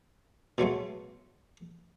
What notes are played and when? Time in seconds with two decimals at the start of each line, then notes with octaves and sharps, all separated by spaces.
0.58 B2 F#3 G#3 A3